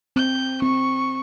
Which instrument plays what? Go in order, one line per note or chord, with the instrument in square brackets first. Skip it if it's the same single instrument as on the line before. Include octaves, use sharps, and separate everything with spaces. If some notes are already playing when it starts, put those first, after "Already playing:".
[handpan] C4 [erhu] G6
[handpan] C4 [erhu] C#6